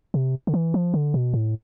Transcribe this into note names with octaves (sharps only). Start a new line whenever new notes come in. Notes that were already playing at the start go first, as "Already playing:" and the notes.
C3
D3
E3
F3
D3
B2
A2